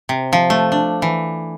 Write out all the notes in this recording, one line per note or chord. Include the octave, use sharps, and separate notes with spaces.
C3
F3
A3
D4
E3